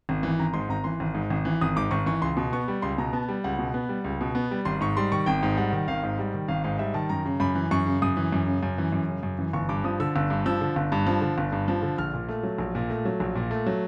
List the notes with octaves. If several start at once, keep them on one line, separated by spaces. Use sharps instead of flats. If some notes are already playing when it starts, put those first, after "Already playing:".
G#1
E3
G#1 A#5
G#2 C6
G#1 A#5
E3 C6
G#1
G#2
G#1
E3
G#1 D#6
G#2 D6
G#1 C#6
E3 C#6
C#2 C6
B2
B3 C#6
G3
C#2 C6
B2 A#5
B3 A5
G3
C#2 F#5
B2
B3
G3
C#2
B2
B3
G3
G#1 C6
G#2 C#6
G3 C6
D#3 C#6
G#1 G5
G#2
G3 F#5
D#3
G#1 F5
G#2
G3
D#3
G#1 F5
G#2 F5
G3 E5
D#3 A5
F#2 A#5
C#3
F#2 B5
E3
F#2 C#6
C#3
F#2 D#6
E3
F#2
C#3
F#2
E3
F#2
C#3
F#2
E3
G1 C#6
G2 D6
F3 D#6
D3 E6
G1 E6
G2
F3 E6
D3
G1
G2
F3
D3
G1
G2
F3
D3
A#1 F6
A#2
A3
F#3
A#1
A#2
A3
F#3
A#1
A#2
A3
F#3